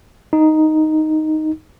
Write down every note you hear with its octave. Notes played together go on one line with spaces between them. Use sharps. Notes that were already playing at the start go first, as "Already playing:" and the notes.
D#4